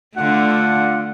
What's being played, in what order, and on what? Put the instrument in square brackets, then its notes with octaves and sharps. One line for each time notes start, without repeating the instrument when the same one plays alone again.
[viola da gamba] D3 A3 [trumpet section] D4 F4 F#5